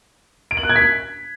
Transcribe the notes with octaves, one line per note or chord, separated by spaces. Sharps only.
D7
F#7
F#6
G#6
B6